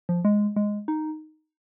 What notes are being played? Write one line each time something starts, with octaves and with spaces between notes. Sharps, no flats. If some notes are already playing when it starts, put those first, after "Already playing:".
F3
G#3
G#3
D#4